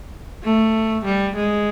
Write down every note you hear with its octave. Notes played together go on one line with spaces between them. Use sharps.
A3
G3
G#3